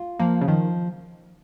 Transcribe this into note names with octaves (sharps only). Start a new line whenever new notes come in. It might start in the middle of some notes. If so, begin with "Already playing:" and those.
Already playing: F4
F3 A#3
C#3
D#3 F3